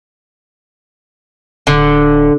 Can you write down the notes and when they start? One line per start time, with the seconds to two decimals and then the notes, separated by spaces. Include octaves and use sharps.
1.67 D1 D3